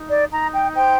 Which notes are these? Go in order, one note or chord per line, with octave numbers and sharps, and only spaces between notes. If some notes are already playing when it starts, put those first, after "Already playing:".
Already playing: D#4
D5
D#4 A#5
G5
C5 G5